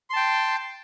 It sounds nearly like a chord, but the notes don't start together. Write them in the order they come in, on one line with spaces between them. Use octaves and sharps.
C6 A5 G5